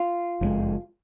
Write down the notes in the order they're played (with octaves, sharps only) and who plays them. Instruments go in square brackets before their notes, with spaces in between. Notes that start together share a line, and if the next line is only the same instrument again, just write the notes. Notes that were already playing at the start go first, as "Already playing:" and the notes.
Already playing: [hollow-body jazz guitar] F4
[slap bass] F#1 F2 C#3 G#3